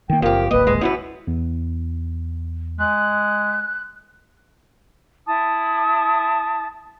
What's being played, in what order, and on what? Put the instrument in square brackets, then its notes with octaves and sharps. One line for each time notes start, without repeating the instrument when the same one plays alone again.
[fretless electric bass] D#3 A#3 [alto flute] G5
[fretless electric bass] F#1 [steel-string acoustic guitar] F2 G4 [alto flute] A#4
[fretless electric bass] D1 G#1 A#3 [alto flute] B4 [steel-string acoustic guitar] D#5
[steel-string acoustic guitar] G#3
[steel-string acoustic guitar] F#2 F#3 B4 [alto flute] E4
[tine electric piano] E2
[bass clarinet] G#3 [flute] F#6
[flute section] E4 A5 D#6